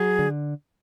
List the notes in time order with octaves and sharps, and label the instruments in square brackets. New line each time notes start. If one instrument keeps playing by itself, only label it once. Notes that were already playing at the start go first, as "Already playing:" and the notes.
Already playing: [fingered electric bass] F#3 [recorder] G#4
[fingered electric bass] D3